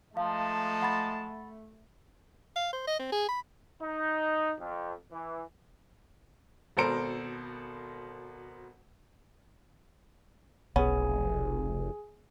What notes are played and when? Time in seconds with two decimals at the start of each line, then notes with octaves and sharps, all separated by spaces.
0.17 F3 G#3 A3 D#4 F5 A5
0.82 F#5 B5 A6
2.56 F5
2.73 C5
2.87 D#5
2.99 C4
3.12 G#4
3.28 B5
3.82 D#4
4.59 F2
5.12 E3
6.77 G#1 B2 A4 A#4 C5 D7
10.76 F1 B1 B3 C#4 G#4 G#5